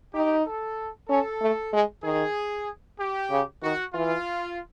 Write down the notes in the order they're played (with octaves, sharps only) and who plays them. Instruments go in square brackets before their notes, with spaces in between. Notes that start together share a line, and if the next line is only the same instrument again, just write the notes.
[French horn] D#4 [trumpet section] G4
[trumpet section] A4
[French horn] C#4 [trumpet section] A4
[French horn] A3
G#3
[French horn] D#3 [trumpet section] G#4
[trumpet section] G4
[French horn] C#3
[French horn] D#3 [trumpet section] F#4
[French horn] E3 [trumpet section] F4